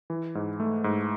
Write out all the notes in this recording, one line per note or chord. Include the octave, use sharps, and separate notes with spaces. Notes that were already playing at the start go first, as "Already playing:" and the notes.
E3
G#2
A3
G#2